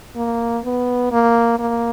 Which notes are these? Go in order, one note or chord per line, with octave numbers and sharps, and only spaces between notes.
A#3
B3
A#3
A#3